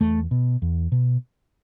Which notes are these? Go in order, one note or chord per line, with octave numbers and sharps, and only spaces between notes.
E2 A3
B2
E2
B2